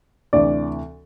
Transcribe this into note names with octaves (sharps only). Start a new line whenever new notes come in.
D2 C3 E3 D5